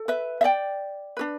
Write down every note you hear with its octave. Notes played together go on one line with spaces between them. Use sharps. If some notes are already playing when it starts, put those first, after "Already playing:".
Already playing: A4
B4 E5
E5
D5 G5
D4 G4 B4